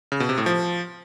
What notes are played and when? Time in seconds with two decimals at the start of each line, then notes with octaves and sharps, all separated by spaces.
0.12 C#3
0.20 B2
0.29 C3
0.38 A2
0.46 F3